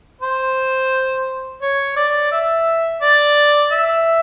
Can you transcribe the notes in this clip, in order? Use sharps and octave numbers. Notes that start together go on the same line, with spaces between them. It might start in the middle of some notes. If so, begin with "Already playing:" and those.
C5
C#5
D5
E5
D5
E5